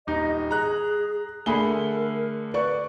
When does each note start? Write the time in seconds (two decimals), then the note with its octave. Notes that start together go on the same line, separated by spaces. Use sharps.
0.07 D#1 D#4 D#5
0.51 G#4 A#5 F#6
1.46 D3 A3 G#4 A#4 B5 G7
2.54 B4 D5 C#6